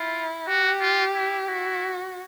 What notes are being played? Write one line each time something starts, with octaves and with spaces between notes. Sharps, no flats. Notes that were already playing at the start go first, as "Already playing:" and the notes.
Already playing: E4 F4
F#4 G4
F4
E4
E4 F#4